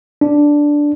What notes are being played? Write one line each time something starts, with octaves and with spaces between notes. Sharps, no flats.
D4